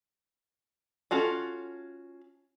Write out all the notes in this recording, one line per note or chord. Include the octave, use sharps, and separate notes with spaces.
C#4 F4 F#4 A4